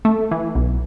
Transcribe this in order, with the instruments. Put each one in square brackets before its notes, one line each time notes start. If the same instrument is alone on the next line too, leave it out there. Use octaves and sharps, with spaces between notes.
[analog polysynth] A3
E3
B1